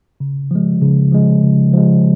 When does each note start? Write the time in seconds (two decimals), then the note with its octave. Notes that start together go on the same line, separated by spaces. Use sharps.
0.20 C#3
0.51 F3 G#3
0.81 C#3
1.12 F3 G#3
1.42 C#3
1.73 F3 G#3